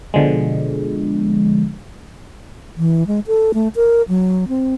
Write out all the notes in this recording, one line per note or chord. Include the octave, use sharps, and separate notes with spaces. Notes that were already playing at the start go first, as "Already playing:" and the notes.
B2 D3 F3 G#3
E3
G#3
A4
A3
A#4
F#3
C4